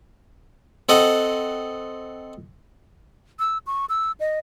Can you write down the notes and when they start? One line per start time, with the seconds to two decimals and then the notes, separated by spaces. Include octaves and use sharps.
0.89 C4 A4 D#5 F#5
3.39 E6
3.67 C#6
3.89 E6
4.20 D#5